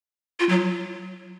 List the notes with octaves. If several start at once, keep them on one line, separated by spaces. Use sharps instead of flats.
F4
F#3